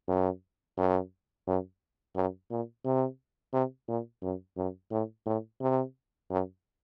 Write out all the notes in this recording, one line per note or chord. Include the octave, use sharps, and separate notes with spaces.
F#2
F#2
F#2
F#2
A#2
C3
C3
A#2
F#2
F#2
A2
A2
C3
F#2